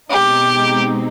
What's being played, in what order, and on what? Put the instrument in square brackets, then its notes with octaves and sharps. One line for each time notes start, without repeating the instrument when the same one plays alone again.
[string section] B2 G#3 C4 D#4 [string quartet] G4